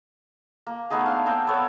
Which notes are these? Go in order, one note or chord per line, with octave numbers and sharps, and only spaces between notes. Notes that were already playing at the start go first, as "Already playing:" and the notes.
A#3
A3 B3 D#4 G#4
D4 F5
A#3 C4 C5 G5
B3 A4 C#5